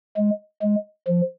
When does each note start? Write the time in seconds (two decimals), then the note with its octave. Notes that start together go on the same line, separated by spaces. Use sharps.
0.17 G#3
0.62 G#3
1.08 F3